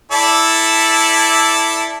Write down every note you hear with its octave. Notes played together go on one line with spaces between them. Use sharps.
E4 A4 D5